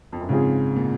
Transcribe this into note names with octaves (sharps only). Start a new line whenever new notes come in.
F2
F#2
G#2 C#3 F3 C4 F4 G#4
A#2